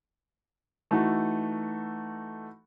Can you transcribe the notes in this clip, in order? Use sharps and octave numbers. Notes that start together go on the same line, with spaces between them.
E3 A3 D#4 F#4 A4